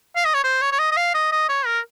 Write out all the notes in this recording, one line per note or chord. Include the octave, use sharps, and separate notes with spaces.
F5
D#5
C#5
C5
C#5
C#5
D#5
D#5
F5
D#5
D#5
C#5
A#4